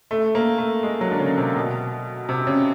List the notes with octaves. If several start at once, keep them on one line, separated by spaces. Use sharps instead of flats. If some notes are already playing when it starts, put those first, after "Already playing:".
A3
A#3
A3
G#3
F#3
D3
C#3
C3
B2
C3
C#3